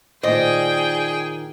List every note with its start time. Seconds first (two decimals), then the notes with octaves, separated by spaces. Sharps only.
0.23 A#2 D#3 G#4 C5 D5 D#5 G5